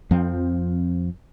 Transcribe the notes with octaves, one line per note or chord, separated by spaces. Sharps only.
F2 F3 C4